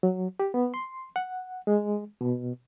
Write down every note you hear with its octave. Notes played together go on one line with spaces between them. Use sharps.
F#3
G4
B3
C6
F#5
G#3
B2